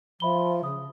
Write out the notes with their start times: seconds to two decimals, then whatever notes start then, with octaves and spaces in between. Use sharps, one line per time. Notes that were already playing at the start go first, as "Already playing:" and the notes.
0.20 F3 E5 B5 G7
0.64 C#3 D#6